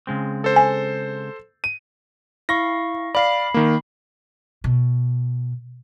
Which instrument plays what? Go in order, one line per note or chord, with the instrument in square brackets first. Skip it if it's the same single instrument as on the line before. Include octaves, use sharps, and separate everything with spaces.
[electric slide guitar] C#3 G#3 C4
[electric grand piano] A4 C5
[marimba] G#5
[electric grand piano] D#7
[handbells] E4 F5 C#6 [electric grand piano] A#6
[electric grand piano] D5 F5 [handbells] B5 C7
[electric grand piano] D#3 A#3
[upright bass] B2